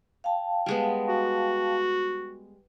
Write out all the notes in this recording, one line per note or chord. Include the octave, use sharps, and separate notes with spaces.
F5 G5 A5
G3 G#3 B3
F#4